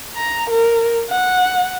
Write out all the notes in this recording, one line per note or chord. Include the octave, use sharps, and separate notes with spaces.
A#5
A#4
F#5